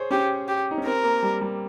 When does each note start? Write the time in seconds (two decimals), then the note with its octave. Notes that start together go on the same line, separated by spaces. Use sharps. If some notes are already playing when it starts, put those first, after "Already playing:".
Already playing: G#4 C5 C#5
0.11 C#4 G4
0.48 G4
0.71 D#4
0.78 C#4
0.85 C4 A#4
1.04 A#3
1.23 G3
1.41 G3